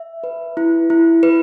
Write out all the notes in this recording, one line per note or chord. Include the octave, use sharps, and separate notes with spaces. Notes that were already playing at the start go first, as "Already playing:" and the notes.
Already playing: E5
B4
E4
E4
B4